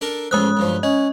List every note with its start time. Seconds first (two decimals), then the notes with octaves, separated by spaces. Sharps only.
0.01 D4 A4 A#4
0.31 A1 E2 F3 G#3 D#6 F#6
0.57 B1 G2 F3
0.83 C#4 D#5